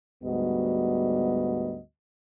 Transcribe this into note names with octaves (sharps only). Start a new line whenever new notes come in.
D2 G#2 G3 B3 F#4 D#5